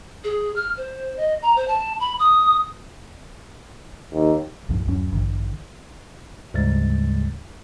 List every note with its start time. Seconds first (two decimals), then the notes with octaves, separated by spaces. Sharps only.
0.24 G#4
0.56 F6
0.77 C5
1.17 D#5
1.42 A#5
1.56 C5
1.68 A5
2.00 B5
2.19 D#6
4.13 D#2
4.69 B1 F#2 A2 F3
4.88 D1 F#2 F#3 C#4
5.12 A1 G2 D3 E3
6.54 D2 G#2 C#3 G3 G#3 A6